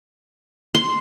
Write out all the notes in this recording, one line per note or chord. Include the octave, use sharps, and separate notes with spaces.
C6